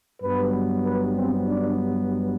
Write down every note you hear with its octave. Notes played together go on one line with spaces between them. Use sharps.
G2 F#3 B3 B4
B4
C4
D4